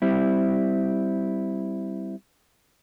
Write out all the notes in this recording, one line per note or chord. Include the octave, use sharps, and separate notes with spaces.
G3 C4 E4